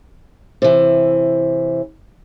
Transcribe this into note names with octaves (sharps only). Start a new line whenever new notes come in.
C3 E3